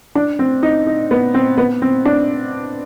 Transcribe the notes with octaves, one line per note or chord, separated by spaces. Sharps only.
D4
C4
D#4
D#4
B3
C4
B3
C4
D4